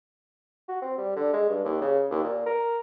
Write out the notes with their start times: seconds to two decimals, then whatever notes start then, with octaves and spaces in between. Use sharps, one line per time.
0.68 F#4
0.82 C4
0.98 G3
1.16 D3
1.33 G#3
1.49 G2
1.65 D#2
1.81 C#3
2.10 D#2
2.24 A#2
2.46 A#4